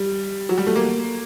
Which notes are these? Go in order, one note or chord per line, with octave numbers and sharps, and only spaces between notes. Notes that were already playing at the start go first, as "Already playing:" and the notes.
Already playing: G3
F#3
G3
A3
A#3